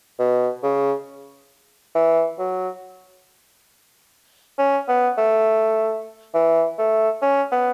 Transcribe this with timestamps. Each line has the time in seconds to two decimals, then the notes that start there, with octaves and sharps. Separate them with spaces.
0.19 B2
0.63 C#3
1.95 E3
2.38 F#3
4.58 C#4
4.88 B3
5.18 A3
6.34 E3
6.78 A3
7.22 C#4
7.51 B3